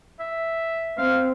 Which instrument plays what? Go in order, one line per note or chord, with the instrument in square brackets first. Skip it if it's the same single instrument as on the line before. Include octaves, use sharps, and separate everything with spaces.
[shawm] E5
[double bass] C4 [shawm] F5